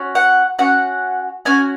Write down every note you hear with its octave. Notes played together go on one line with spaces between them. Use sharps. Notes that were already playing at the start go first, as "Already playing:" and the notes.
Already playing: C#4 F#4
F#5
C#4 F#4 F#5
C#4 F#4 G#5